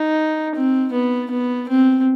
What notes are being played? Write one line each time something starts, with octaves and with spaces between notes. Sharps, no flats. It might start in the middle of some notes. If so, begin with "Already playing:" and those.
Already playing: D#4
C4
B3
B3
C4